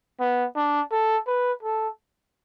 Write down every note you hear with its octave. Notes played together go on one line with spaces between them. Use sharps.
B3
D4
A4
B4
A4